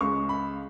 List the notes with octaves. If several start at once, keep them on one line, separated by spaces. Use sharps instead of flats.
C#2 C#3 G#3 C#6
B5